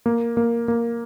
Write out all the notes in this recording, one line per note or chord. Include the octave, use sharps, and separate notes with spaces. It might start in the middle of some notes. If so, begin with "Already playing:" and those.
A#3
A#3
A#3